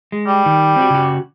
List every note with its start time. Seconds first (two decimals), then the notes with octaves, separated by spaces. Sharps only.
0.12 G#3
0.27 G3
0.46 D#3
0.76 C4 F#4
0.90 C#3 F#4